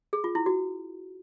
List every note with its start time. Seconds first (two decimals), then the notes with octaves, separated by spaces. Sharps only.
0.13 G#4
0.24 F4
0.35 E4
0.46 F#4